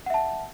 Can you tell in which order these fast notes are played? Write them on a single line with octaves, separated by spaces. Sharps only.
F#5 E5 A5